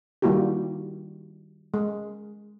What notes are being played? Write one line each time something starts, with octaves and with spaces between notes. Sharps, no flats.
D#3 G3 A#3 E4 F#4 G4
G#3